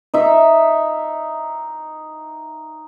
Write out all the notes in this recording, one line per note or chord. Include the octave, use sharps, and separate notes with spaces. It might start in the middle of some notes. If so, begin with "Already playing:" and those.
D#4 E5